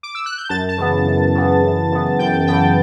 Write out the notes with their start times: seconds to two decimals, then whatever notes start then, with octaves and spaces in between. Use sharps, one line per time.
0.03 D6
0.15 E6
0.26 F#6
0.38 G6
0.49 F#2 A5 A6
0.69 A5 A6
0.78 C#3 E3 B3
1.07 F#2
1.35 C#3 E3 B3
1.63 F#2
1.92 C#3 E3 B3
2.19 F#2 G5 G6
2.47 C#3 E3 B3 G5 G6